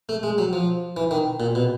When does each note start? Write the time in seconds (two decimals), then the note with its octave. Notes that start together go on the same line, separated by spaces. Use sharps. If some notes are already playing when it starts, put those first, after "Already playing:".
0.09 A3
0.23 G#3
0.38 F#3
0.53 F3
0.97 E3
1.11 D#3
1.40 A#2
1.55 B2